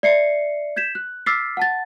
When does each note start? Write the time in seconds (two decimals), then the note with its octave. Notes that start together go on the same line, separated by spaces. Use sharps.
0.03 D5 E5 C7 C#7
0.76 G6 G#6 B6 E7
0.95 F#6
1.26 D6 E6 F6 A6 B6 C7
1.57 F#5 A5 A6